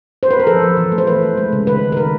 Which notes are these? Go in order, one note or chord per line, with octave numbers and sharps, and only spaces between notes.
C5
B4
A#4
F3 A4
F3
E3
A3
C5
E3 B4
E3
G#3
C#3
D#3 B4
D#3
A#4
D#3 B4